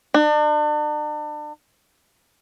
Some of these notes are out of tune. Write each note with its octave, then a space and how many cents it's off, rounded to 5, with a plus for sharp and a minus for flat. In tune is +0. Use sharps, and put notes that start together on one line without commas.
D4 +40